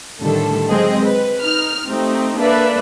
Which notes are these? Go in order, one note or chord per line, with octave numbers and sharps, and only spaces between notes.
A2 D3 D#3 G3 A4
F#3 G#3 C4 G#4 D#5
B4
D#4 F6
A3 C4 D#4 G4
A#3 D4 A4 B4 D5 E5